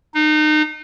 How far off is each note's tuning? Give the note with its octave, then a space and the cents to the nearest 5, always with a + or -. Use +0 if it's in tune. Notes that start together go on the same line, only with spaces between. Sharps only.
D#4 -30